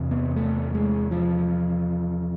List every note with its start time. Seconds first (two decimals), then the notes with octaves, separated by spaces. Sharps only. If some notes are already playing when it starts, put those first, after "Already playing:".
Already playing: E2 C3
0.11 B3
0.36 A3
0.74 G#3
1.11 F3